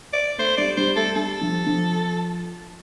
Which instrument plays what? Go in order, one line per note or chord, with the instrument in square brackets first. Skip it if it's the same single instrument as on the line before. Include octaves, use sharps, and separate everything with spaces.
[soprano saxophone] D5
[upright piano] A3 [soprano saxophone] C5
[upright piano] G3 [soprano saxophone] D5
[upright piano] G3 [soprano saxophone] C5
[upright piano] A3 [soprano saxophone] A4
[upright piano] G3 [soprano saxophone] A4
[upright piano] F3
F3